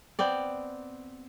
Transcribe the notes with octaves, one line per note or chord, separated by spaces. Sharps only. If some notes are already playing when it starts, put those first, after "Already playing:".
B3 C4 D5